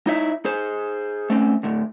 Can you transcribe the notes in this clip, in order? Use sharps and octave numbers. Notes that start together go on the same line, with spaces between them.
D#4 E4 C#5 E5
G#4 C5
A3 C4 C#4
D2 A2